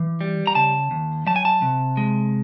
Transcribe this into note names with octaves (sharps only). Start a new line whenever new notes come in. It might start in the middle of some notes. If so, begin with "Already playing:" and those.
Already playing: E3
G3
A#5
C#3 A5
D#2
F#3 A5
G#5
A5
C3
G#3